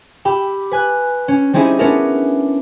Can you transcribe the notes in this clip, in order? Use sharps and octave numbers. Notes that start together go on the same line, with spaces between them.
G4 G5 B5 E6
B4 G#5 F#6
C#4
G3 C4 C#4 D#4 E4 G#4
B3 C#4 D4 E4 A#4